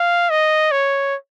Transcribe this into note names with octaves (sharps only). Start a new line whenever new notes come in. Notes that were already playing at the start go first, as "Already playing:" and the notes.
Already playing: F5
D#5
C#5